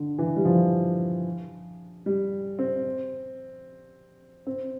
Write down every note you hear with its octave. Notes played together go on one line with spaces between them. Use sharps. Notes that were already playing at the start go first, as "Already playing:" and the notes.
Already playing: D3
E3
G3
F3
G3
C4
C4